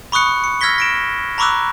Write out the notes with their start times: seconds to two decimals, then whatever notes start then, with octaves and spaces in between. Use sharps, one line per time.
0.12 B5 C#6 D#6 F#6 C#7
0.44 C#7
0.61 E6 F6 G#6 A#6 B6 G7
0.78 A#6 D7 E7
1.38 A#5 B5 C#6 D6 E6 F#6